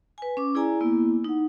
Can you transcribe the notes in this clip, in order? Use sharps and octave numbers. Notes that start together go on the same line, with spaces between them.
B4 G#5
C#4 D6
E4 G#4 D5 G#5 A#5
A#3 B3 E4
D#4 F#5